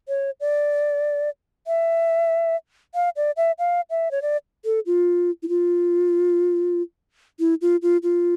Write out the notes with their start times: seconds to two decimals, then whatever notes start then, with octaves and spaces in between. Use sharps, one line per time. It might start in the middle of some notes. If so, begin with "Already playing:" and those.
0.08 C#5
0.40 D5
1.67 E5
2.95 F5
3.16 D5
3.37 E5
3.59 F5
3.90 E5
4.11 C#5
4.22 D5
4.65 A4
4.86 F4
5.43 E4
5.49 F4
7.40 E4
7.61 F4
7.82 F4
8.03 F4